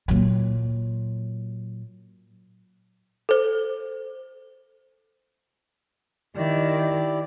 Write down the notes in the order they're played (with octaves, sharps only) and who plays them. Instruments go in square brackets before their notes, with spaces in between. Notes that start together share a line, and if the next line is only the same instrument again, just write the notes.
[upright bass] A#2 F#3
[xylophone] A4 C5
[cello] D#3 [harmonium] E4 G4 D5